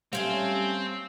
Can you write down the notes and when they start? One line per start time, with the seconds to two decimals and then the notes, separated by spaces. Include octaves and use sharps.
0.13 G3 A3 C4 C#4 F5